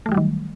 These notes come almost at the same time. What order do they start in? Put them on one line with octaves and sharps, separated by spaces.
A3 E3 G3 F#3 D#3